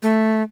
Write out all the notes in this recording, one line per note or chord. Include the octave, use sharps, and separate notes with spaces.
A3